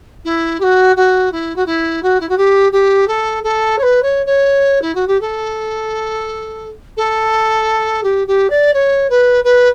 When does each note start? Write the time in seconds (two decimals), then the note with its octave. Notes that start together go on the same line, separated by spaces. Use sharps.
0.25 E4
0.60 G4
0.63 F#4
0.96 F#4
1.32 E4
1.56 F#4
1.66 E4
2.03 F#4
2.20 E4
2.29 F#4
2.38 G4
2.72 G4
3.08 A4
3.43 A4
3.78 C#5
3.83 B4
4.03 C#5
4.26 C#5
4.82 E4
4.95 F#4
5.07 G4
5.21 A4
6.97 A4
8.03 G4
8.27 G4
8.50 D5
8.74 C#5
9.10 B4
9.44 B4